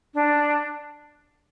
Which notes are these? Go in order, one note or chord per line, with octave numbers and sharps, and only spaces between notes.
D4